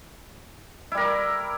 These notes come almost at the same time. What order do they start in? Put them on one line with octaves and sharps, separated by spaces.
E4 G3 A#4